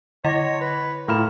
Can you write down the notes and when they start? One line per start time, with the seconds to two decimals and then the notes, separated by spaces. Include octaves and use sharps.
0.24 D3 E4 C#5 D#5 D6 A#6
0.61 B4
1.08 A2 A#3 F4 B5 C6 F6 E7